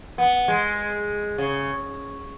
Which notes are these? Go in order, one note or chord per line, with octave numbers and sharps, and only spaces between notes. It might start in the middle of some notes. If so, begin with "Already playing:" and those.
B3
G#3
C#3